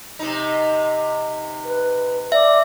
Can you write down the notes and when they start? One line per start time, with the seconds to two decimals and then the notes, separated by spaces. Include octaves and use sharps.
0.19 C3 D#4
1.64 B4
2.32 D5 E5